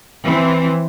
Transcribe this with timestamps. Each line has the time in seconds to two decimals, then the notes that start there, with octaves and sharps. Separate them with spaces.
0.24 E3 C4